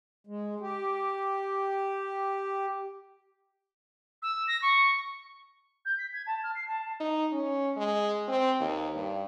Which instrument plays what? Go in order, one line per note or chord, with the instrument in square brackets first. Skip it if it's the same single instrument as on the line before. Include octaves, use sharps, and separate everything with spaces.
[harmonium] G#3
G4
[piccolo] E6
A#6
C#6
G6
B6
G#6
A5
F6
C7
A5
[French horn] D#4
C#4
G#3
C4
D#2
G2